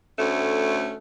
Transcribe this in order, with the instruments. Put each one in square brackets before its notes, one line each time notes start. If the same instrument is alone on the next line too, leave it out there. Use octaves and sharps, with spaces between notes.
[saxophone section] D2 A3 C#4